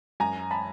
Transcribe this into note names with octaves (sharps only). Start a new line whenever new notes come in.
F#2 G#5 A#5
A5 B5